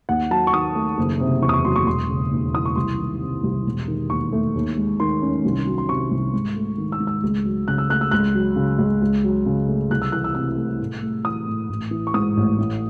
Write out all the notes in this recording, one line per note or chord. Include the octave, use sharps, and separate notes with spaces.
D#2 F#5
F#3 A5
C#6
D#3 D#6
A3
F#1
C3
E2 C#6
D#6
C#6
F#3 C6
C#6
E1 C6
C#3
D#2
E3 D#6
C#6
C2 C6
D#3
C3
C2
E1
D#3
D#2 C#6
A3
D#2
G#3
D#3 C6
C#4
C2
F#3
C6
C3 C#6
C2
G#2
A3
D#3
E6
G#2
E6
C#2
F#3
C#3 F#6
E6
A3 F#6
E6
C#2 F#6
F#3
C#3
C#2
C#2
F#3
C#3
A3
C2 F#6
E6
E3 F#6
E6
C3 E6
A3
A2
A3
E3 D#6
A2
A1
E3
C#6
G#2 D#6
A1
A2